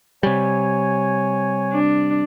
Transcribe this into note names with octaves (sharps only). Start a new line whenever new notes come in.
C3 G3 C#5 G#5
D4